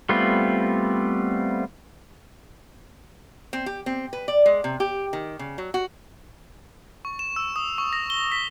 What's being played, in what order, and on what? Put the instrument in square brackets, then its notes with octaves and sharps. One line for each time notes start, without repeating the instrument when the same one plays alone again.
[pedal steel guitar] G3 A3 B3 C4 F4
[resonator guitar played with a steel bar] C4
G4
C4
B4
D5
G#3
C3
G4
D#3
C#3
F#3
F#4
[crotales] C#6
E7
E6
D#6
C#6
A#6
G7
B6